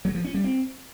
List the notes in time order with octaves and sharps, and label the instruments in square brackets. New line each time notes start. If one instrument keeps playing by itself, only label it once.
[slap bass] F#3
F3
C#4
G3
C4